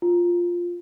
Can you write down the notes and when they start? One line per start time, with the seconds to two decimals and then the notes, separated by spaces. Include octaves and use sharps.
0.02 F4